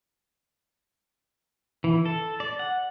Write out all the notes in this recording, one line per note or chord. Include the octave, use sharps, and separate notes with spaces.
E3
A4
D5
F#5